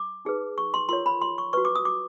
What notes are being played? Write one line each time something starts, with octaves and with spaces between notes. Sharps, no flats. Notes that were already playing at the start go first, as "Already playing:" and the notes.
Already playing: D6
D#4 G#4 B4
C#6
C6
F4 A#4 C#5 C6
B5
C6
C#6
F#4 B4 C#6
D6
D#6
D6